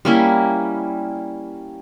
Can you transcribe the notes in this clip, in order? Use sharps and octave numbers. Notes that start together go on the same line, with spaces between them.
G3 A#3 C#4 E4